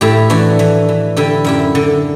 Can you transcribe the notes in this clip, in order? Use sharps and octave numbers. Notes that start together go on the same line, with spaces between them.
A2 E4 G4
E3 D4 F#4
E3
E3
D3 E4 G4
F#2 E4 G4
D3